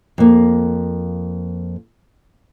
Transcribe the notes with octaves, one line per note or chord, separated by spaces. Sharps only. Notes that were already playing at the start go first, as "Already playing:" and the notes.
F2 A#3